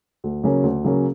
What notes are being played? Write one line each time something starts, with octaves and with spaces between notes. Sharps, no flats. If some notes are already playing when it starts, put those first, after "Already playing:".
D2
C#3 F#3 A#3 C#4
D2
C#3 F#3 A#3 C#4